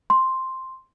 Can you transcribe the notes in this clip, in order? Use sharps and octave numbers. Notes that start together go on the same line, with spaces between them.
C6